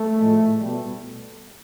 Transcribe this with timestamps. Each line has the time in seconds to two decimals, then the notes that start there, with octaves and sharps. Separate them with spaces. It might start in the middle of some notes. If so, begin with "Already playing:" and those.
Already playing: A3
0.17 A2 F3 G#3
0.60 B2 G3